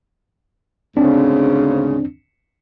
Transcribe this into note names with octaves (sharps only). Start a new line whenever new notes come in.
D2 G#2 C#3 C4 D4